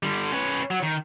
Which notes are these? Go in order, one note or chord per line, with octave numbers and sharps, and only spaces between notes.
D3 G3
C#4 B4
F#3
D#3